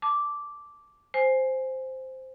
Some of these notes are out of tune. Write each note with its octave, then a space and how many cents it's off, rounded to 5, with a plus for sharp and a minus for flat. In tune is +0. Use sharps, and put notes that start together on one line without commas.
A5 -5 D6 -5
C5 +0 G#5 +0